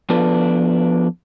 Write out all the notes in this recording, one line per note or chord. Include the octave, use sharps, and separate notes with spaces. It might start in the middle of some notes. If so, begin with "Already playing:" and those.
F3 B3 D4 F4 A4 B4